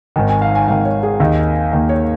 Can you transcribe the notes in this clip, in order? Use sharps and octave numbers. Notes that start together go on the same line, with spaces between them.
G#1 G#2 D#3 G#5
G#5
F5
G#5
G#1 G#2 D#3 F5
C#5
G#4
D#2 D#3 A#3 D#4
D#2 D#3 A#3 D#4 A#4
C#5